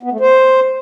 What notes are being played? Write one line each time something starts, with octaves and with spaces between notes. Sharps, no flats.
B3
A3
C5